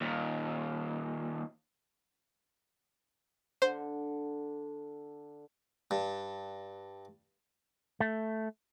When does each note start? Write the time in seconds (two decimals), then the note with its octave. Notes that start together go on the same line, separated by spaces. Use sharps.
0.01 D#2 A#2
3.62 D3 C5
5.91 G2
8.00 A3